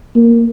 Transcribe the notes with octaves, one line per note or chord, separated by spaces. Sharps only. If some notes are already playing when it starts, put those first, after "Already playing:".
A#3